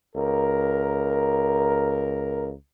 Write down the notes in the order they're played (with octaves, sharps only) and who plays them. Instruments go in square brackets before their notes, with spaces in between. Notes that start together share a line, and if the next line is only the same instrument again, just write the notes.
[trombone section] C#2 A#4